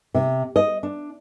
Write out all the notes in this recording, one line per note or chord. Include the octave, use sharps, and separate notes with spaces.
C3
D#5
D4